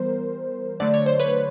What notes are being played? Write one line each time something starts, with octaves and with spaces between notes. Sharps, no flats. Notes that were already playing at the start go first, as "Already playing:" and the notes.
Already playing: E3 G3 B3 A#4 C5
D3 F#3 A3 D5
C#5
C5
B4 C#5